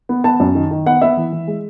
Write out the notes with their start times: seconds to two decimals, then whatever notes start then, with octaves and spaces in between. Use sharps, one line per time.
0.09 B3
0.24 B3 A5
0.40 F#2
0.55 D#3
0.71 D#3
0.86 B3 F#5
1.02 B3 E5
1.17 E3
1.33 E3
1.47 G#3